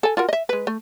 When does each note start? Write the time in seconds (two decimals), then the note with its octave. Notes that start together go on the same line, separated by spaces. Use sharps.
0.03 A4 G#5
0.17 F4 F#4 A#4
0.29 D#5 E5
0.49 G#3 B4
0.67 A3